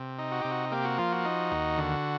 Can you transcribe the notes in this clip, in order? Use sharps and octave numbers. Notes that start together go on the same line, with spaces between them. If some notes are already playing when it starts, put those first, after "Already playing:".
Already playing: C3
D#4
F#4
C3 G4
F#4
A#3 G4
F#4
F3 F4
F#4
D#4
D#2
D3